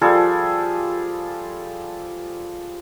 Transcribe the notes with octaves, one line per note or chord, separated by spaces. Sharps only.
F3 G3 G#4 A4